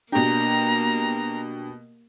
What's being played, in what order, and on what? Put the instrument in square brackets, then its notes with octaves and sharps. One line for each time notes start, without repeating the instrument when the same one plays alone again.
[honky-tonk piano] B2 G4 [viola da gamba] A#3 [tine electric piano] D4 [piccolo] A#5